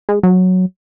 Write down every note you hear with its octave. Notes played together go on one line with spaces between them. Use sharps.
G#3
F#3